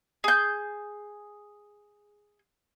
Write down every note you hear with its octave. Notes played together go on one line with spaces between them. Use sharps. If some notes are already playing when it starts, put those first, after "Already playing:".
G#4 G6